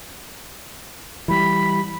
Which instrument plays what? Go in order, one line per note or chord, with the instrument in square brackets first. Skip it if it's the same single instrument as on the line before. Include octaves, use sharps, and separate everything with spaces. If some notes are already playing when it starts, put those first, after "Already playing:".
[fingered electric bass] E3 G3 [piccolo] B5